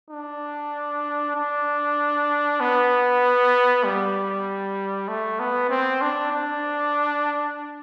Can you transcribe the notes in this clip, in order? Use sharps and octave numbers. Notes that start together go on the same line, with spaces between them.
D4
D4
B3
G3
A3
B3
C4
D4
D4